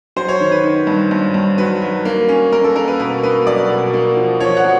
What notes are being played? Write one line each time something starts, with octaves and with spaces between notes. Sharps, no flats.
F#3 C5
C#5
D#3
B4
D#3
G2
G2
G2
F#3 B4
F#3
A#3
C#4
A#3 A#4
A4
A#3 A#4
B4
B2 B4
A#3 B4
F#3 D5
B2
A#3
F3
F3 C#5
F#5
A#3